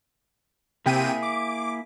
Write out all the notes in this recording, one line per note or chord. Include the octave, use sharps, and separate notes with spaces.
C3 A#3 E4 G#4 G5 D#7
D6